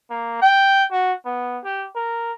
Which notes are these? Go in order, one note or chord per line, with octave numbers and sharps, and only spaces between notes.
A#3
G5
F#4
B3
G4
A#4